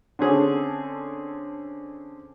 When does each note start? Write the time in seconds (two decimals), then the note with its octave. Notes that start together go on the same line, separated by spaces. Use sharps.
0.19 D3 C4 C#4 G#4 A4